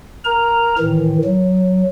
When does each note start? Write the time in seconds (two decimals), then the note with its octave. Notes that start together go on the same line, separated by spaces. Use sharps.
0.25 A#4 A#5
0.79 A2 D#3 E3
1.25 F#3